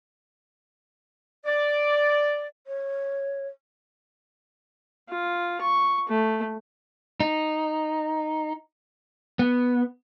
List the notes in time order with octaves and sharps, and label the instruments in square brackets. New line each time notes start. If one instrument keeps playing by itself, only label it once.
[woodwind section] D5
[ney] C#5
[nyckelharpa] F4
C#6
A3
[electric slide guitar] D#4
B3